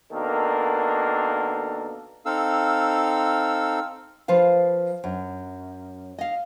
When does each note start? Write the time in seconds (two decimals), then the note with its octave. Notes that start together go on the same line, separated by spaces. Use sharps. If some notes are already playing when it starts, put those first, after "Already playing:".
0.13 B2 D#3 A#3 D4 A4 A#4
2.25 C4 D#4 A4 F5 E6
4.28 F3 B4 F5
5.04 F#2
6.19 D#5 F5